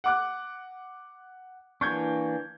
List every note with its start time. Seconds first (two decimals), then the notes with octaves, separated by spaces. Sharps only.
0.04 F#5 D6 F#6
1.81 E3 A#3 D4 C#6 G6 G#6